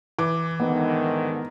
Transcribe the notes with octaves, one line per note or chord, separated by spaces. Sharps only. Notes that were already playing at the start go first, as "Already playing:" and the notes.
E3 D6
G#2 D3 D#3 B3